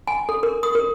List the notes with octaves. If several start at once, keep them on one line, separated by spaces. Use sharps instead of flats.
G#5
A4
A#4
D#6
A#4